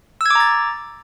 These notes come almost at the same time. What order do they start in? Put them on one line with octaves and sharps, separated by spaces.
E6 G#6 D6 A#5 A6